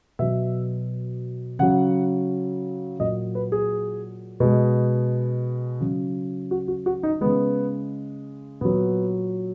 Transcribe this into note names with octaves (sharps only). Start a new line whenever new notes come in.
B2 F#3 E5
C#3 F#3 F#5
A#2 F#3 D#5
B4
G#4
B2 G#3
C#3 F#3
F#4
F#4
F#4
D#4
C#3 G#3 B3
A#2 F#3 B3